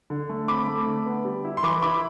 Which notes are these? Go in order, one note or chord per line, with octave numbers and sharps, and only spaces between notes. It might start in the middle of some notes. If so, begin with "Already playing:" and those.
D3
A3
C4 B5 D6
A3
D3
B3
G3
E4
C6
E3 B5 D6
E4 B5 D6